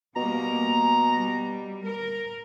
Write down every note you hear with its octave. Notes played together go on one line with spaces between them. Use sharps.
B2 G3 A#3 A#5
G3
A#4